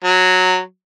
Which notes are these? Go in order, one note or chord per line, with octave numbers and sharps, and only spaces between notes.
F#3